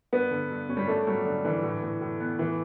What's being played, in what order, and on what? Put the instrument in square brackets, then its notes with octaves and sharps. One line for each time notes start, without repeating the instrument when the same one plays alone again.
[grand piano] G2 [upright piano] B3
[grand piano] D3
G2
C#4
[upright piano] G3
[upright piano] A3 [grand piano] D4
[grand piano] F#3 [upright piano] G3
[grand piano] D3
[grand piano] D3 [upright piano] E3
[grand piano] A2
A2
A2
B3
[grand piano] A2 [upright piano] E3